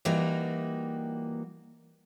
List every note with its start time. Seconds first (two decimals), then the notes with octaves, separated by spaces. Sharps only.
0.05 E3 G3 A#3 D#4 F#4